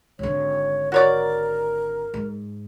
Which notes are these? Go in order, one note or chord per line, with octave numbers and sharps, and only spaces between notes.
G#1 D3 C#5
F#4 A#4 C#5 D5
G#2